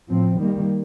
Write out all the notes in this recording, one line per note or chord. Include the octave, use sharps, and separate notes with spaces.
A2 F3 C4
D#3 G3 A#3